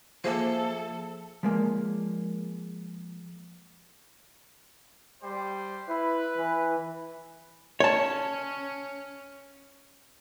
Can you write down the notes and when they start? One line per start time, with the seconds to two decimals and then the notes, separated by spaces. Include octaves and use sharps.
0.24 F3 A#3 G#4 A4 C5 E5
1.43 F3 G#3 A#3
5.23 G3 C5 G5
5.88 E4 B4
6.37 E3
7.80 C#4 C#5 A5